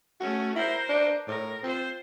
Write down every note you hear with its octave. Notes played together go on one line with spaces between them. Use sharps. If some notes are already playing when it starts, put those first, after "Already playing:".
A3 C#4 F#4
E4 A#4 C5
D4
A2 A#4
C4 F4 C5